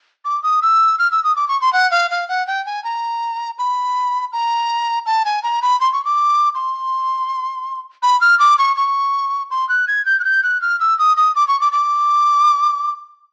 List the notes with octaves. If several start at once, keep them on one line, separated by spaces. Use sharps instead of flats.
D6
D#6
E6
F6
E6
D#6
D6
C#6
C6
F#5
F5
F5
F#5
G5
G#5
A#5
B5
A#5
A5
G#5
A#5
B5
C6
C#6
D6
C6
B5
F6
D6
C#6
C#6
C6
F#6
G#6
G6
F#6
G6
F#6
F6
E6
D#6
D#6
D6
C#6
D6
D6